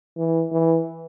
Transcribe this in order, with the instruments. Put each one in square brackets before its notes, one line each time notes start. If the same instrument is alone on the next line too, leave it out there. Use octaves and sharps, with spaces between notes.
[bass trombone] E3
E3